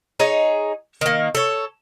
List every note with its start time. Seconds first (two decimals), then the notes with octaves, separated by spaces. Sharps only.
0.20 D#4 G#4 C#5
1.01 D#3 A#3
1.35 A4 C#5